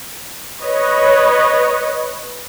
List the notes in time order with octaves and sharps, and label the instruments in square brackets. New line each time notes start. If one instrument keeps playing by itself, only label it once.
[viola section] B4 C#5 D#5